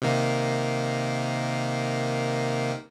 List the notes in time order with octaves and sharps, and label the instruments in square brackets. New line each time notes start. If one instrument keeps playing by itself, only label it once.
[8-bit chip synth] C3 D#3 A#3